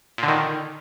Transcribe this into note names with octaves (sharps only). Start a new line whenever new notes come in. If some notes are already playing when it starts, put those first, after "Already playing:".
A#2 D3 D#3